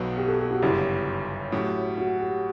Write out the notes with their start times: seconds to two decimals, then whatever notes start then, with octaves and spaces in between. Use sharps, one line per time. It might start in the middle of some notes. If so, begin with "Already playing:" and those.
Already playing: B1 B2 F#3 B3 F#4
0.17 G4
0.28 A4
0.39 G4
0.51 F#4
0.62 G1 F#2 C#3 G3 E4
1.52 A2 F#3 C#4 F#4 G4
1.98 F#4
2.20 G4